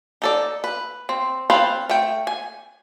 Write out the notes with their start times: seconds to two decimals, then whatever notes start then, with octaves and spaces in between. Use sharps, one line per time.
0.22 D#4 A4 D5
0.64 B4
1.09 C4
1.50 C4 F4 B4 C5 F5
1.89 A3 G5
2.27 G#5